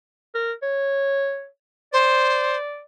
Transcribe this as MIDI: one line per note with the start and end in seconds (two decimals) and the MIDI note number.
0.35 0.53 70
0.62 1.46 73
1.93 2.57 72
1.93 2.82 74